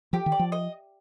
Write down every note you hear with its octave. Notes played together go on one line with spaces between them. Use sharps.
F3 G4
D#3
D5
F3
D#5